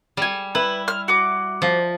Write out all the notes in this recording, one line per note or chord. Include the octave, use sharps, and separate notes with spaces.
G3 G#5
E4 B4
F6
F#4 D6
F3